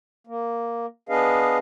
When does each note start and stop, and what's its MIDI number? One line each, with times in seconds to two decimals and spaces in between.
0.27 0.86 58
1.09 1.58 59
1.09 1.58 62
1.09 1.58 68
1.09 1.58 71
1.09 1.58 75
1.09 1.58 77